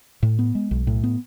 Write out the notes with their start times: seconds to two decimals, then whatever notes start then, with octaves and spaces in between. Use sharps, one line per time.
0.23 A2
0.39 B3
0.55 G#3
0.71 B1
0.87 A2
1.04 B3